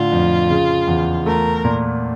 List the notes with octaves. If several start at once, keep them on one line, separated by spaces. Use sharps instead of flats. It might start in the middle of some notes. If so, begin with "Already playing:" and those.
Already playing: A2 D3 F4
F2
C#3
E2
A3 A#4
A#2